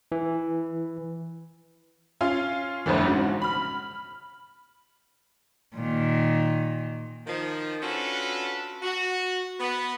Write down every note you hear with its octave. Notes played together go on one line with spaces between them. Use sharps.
E3
C#4 F4 F5
G1 F2 A2 D3 E3
G#2 C#3 F#4
B5 F6
A#2 D#3
D#3 F3
C#4 D4 F4 F#4 A4 B4
F#4
B3